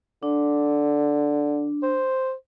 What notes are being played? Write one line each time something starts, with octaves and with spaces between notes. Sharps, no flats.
D3 D4
C5